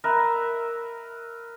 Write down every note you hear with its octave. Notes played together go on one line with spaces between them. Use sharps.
A#4 B4 E5